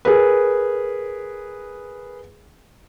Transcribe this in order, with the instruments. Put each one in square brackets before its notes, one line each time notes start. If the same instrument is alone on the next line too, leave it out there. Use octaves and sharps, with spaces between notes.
[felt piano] G#4 A#4 B4